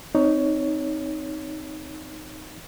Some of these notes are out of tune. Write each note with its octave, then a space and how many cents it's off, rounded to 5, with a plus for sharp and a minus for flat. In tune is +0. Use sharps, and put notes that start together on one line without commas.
C4 +0 D#4 +0 C#5 +15